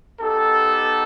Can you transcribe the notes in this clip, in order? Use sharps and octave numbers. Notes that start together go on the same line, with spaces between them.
B3 D#4 G4 A4